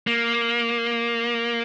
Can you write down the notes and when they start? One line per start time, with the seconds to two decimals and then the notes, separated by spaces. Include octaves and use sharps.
0.07 A#3